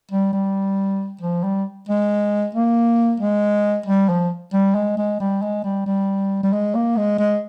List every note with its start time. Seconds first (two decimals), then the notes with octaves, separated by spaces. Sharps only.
0.12 G3
0.33 G3
1.22 F3
1.44 G3
1.89 G#3
2.55 A#3
3.20 G#3
3.87 G3
4.09 F3
4.54 G3
4.75 G#3
4.98 G#3
5.20 G3
5.42 G#3
5.64 G3
5.86 G3
6.44 G3
6.53 G#3
6.75 A#3
6.97 G#3
7.19 G#3